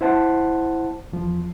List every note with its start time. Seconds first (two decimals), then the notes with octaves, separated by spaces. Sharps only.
0.01 E4 C5 F#5 A5
1.12 E2 F3